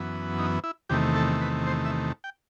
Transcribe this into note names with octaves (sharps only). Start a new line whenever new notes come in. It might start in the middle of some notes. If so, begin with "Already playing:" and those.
Already playing: F#2 E3 B3
D#4
E4
E2 C3 D#3 A3 G4
A4
B4
C5
E5
G5